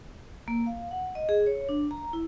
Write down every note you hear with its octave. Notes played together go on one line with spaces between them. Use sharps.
A#3
F5
F#5
D#5
G#4
C#5
D4
A#5
E4